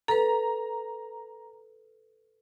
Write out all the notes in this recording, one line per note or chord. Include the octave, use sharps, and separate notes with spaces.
A4 B4 A#5